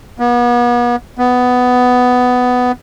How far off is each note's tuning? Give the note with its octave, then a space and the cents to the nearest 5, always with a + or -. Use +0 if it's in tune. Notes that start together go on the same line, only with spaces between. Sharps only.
B3 -40
B3 +10